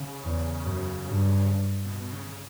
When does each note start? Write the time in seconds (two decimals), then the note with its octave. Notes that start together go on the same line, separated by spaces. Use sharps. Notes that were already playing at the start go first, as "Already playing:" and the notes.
Already playing: C#3
0.24 E2
0.64 F#2
1.05 G2
1.86 B2
2.00 B2
2.12 C#3
2.29 C#3